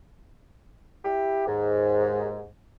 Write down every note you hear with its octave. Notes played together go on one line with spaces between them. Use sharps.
E4 G4
D#2 G#2